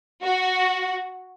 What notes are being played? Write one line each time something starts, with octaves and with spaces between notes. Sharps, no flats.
F#4